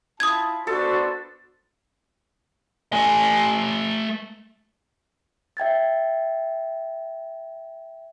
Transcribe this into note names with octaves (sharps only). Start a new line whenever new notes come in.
E4 F4 A5 D#6 G#6
B3 D4 F#4 A4 C5
A3 G#5
E5 G5 G#6 A6